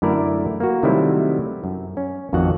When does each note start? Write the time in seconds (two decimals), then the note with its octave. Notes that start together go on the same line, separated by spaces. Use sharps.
0.02 F#2 D3 A3 E4 A#4 D5
0.60 A#3 F#4
0.83 C3 D#3 F#3 G3 A3 E4
1.64 F#2
1.97 C#4
2.33 A1 F2 D#3 F#4 F#5